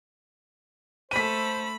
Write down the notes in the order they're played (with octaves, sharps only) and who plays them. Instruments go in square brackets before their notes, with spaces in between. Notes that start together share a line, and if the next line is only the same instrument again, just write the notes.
[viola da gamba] A3 A4 [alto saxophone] C5 [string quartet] B5 [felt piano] B6 D#7